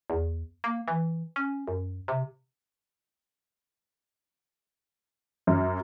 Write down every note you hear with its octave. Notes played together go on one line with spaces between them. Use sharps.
E2
A#3
E3
C#4
F#2
C3
F#2